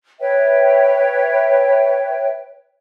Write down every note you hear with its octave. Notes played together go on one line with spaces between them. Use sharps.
B4 C#5 E5 G5